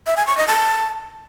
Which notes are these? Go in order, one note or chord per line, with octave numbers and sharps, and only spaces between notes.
E5
G#5
C#6
D#5
A5